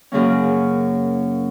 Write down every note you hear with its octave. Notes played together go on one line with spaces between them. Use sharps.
F#2 C#3 A#3 C#4